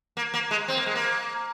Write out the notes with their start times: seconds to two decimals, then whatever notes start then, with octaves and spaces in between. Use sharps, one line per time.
0.17 A#3
0.34 A#3
0.51 G#3
0.68 C4
0.77 A#3
0.86 G#3
0.95 A#3